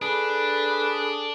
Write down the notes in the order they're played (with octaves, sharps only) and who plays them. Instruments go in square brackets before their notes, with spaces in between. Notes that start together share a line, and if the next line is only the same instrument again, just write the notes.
[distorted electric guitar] D4 [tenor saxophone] G#4 [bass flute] A4 [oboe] B4